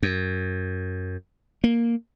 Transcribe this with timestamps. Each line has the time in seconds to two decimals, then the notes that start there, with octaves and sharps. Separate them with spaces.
0.03 F#2
1.64 A#3